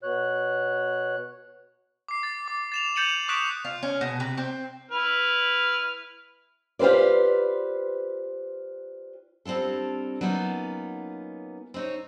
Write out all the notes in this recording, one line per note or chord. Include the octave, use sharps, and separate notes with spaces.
B2 C#5 F#6
D6 C7
A6
D6
A6 E7 F7
G6 A6 C#7 D#7 E7 F#7
C#6 D#6 F#6 B6 D7 E7
F4
C#4
B2
C3
C4
E4 B4 F6
F4 G4 B4 C5 D5
G3 C4 D4 F4 A4
F#3 A#3 B3 C#4 D#4 F4
C4 D#4 C#5